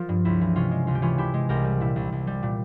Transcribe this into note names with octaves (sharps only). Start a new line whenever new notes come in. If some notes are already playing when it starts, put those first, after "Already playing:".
Already playing: F3 F4 A#4
G2
C#2 E4
E3
C3 C#4 F4
G#3
C#2 F4
G4
E3 C#4 F4
C3 E4 G4
G#3
C2 G4 A#4
G3
A#2 E4
C2
C2
G3
A#2